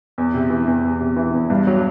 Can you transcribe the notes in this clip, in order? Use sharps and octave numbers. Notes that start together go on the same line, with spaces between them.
E2
C3
E3
E2
E2
C3
E3
E2
G2
F#3